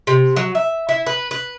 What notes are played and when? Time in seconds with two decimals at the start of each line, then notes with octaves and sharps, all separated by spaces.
0.07 C3
0.36 F#3
0.55 E5
0.89 E4
1.06 B4
1.31 B4